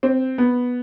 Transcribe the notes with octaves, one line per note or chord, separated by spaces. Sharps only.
C4
B3